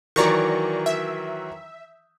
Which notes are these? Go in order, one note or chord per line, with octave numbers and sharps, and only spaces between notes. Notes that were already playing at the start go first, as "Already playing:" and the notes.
D#3 E3 F#3 D5 A#5 C#6
E5